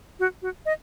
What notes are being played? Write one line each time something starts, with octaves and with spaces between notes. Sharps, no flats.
F#4
F#4
D#5